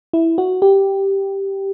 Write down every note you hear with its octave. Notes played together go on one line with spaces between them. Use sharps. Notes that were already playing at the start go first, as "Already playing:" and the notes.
E4
F#4
G4